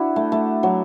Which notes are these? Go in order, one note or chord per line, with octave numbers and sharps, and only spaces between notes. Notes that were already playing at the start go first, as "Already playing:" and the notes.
Already playing: D4 E4 F#4
A3
A3
F#3